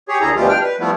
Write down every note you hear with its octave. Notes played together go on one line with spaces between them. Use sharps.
G4 G#4 C#5
D#2 D3 E4 G#4 A4 A#5
D2 B2 E3 G3 F4 G4
D4 G5 F6
B4
F3 G3 A3 B3 E4